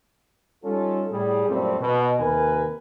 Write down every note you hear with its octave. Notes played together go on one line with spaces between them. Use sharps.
G3 C#4 D#4 F4 A4
A2 G3 G#4
F#2 A#2 G3 A3 C4
B2
D#2 C3 A#4 B4 G#5